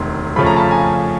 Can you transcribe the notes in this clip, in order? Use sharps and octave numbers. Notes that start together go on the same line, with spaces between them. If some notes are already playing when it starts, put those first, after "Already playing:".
Already playing: E1 D2 C3 D#3 C6
F2 C#3 F3 A3 C#4 B5
A#5
A5 B5
G#5 A#5